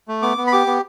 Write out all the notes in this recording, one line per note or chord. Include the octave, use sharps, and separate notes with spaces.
A3
B3 D6
B3
B5
G4 D6
B3